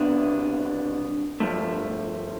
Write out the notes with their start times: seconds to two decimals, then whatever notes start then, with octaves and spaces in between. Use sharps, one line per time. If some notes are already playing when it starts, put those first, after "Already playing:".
Already playing: C2 B2 B3 D4
1.40 G2 F3 A3